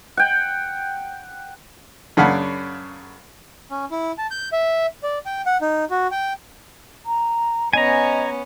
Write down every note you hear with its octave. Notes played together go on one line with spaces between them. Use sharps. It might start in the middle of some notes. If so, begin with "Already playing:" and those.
F#5 G5
F#2 C#3 D4 F5 F#5 B5
C#4
E4
A5
G6
E5
D5
G5
F#5
D#4
F#4
G5
A#5
B3 C#4 D#5 G#5 A#5